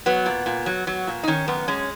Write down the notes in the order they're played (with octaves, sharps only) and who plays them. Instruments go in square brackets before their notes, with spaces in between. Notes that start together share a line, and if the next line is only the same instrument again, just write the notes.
[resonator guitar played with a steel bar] F#3 B3
A#2
A#2
F#3
F#3
A#2
D#4
D#3 C#4
F#2 B3
G#3 C#4